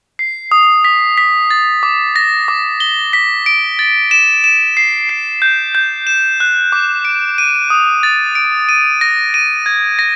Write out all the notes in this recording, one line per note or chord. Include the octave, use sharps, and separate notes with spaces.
C7
D#6
B6
B6
A6
D6
A#6
D6
G7
B6
D7
A6
E7
E7
C7
C7
G6
G6
E7
F#6
D6
D7
D#7
D#6
A6
D7
D#7
A#6
D#7
G#6
A#6